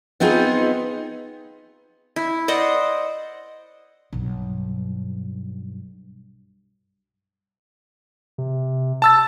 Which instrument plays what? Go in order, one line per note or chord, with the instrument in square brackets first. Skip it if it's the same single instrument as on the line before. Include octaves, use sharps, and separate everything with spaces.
[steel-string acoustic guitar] B3 C4 D#4 F4 G#4
[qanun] E4
C5 D5 D#5 F#5
[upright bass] B1 G2
[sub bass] C3
[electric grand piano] A5 E6 A6